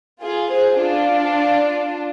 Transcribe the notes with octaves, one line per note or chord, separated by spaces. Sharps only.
F4 G#4
G#4 C5
D4 F4